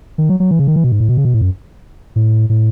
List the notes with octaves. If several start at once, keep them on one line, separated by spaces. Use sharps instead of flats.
D#3
F#3
F#3
E3
C#3
D#3
E3
B2
G#2
A2
B2
C#3
B2
A2
F#2
A2
A2